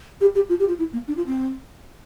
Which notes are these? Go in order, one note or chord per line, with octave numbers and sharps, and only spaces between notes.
G4
G4
F4
G4
F4
E4
A#3
D4
F4
C4